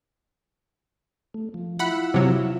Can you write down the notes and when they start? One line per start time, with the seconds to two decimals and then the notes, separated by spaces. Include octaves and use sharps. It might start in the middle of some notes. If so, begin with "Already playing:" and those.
1.34 A3
1.54 F3
1.79 E4 F4 E5 F#5 B5
2.14 C3 F#3